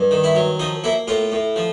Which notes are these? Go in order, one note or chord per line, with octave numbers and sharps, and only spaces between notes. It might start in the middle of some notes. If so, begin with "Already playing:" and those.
Already playing: G2
D#3
E4
F#3
F3 D#4
A#3 E4
A2 F4
A2
F3